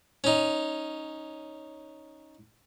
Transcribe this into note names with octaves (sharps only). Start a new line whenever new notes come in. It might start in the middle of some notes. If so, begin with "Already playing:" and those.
C#4 D#4